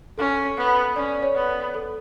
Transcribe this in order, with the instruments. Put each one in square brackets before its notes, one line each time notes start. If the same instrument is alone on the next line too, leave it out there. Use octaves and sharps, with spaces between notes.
[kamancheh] C#4 [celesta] A4
[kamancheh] B3
[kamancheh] C#4 [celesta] D5
[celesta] C#5
[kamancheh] B3
[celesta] A4